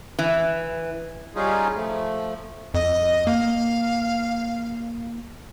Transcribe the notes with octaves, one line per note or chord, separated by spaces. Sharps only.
E3
G3 C#4 D#4 F4 G#4
F3 A3
F2 D#5
A#3 F5